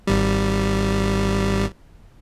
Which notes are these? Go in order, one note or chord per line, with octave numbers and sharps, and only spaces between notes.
G#1 G3